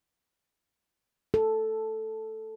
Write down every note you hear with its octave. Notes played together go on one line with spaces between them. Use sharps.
A4